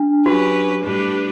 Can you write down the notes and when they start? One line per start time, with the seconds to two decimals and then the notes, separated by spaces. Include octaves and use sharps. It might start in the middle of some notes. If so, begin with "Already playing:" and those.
Already playing: D4
0.26 F#3 C#4 F#4 G4 B4
0.83 A2 G3 D4 G4 B4